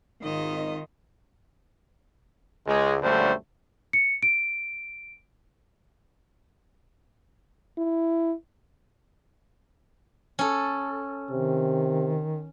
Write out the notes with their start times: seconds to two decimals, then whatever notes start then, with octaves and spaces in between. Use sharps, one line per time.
0.22 G#1 D#3 D#4 F4 D#5
2.66 C#2 G#3
3.01 A#1 F#2 D3 G3 A3 C5
3.93 C#7
4.23 D7
7.78 E4
10.39 C#4 A4
11.31 C3 D#3